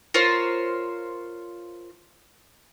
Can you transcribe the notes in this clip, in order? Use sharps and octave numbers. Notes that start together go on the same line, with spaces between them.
F4 A#4 C5 C#5